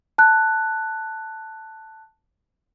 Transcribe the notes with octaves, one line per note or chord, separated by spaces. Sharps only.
A5 F#6